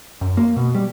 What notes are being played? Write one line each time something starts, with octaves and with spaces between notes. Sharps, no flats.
F#2
A#3
B2
G3